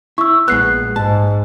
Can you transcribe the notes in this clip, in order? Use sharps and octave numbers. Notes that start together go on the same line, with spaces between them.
E4 C#6 E6
A#1 G#3 B3 F#6 C7
G#2 A5